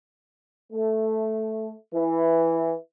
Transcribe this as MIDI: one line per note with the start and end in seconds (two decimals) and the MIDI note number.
0.71 1.71 57
1.92 2.73 52